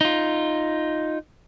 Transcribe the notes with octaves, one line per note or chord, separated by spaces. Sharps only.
D#4 F4